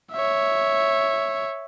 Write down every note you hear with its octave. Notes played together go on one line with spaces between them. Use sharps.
C#5 E5